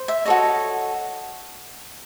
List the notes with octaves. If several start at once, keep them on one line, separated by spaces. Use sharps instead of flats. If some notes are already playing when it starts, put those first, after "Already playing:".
Already playing: C5
E5
F#4 A4 C#5 D#5